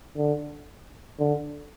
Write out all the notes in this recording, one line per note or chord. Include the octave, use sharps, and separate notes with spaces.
D3
D3